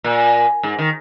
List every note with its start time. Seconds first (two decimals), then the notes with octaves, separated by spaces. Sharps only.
0.04 A#2
0.63 G#2
0.79 D#3